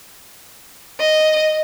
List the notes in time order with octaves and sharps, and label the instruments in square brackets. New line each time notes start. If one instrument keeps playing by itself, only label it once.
[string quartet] D#5